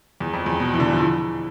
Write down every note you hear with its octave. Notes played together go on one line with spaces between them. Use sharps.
E2
F2
E2
B2
E3
D3
F3
E3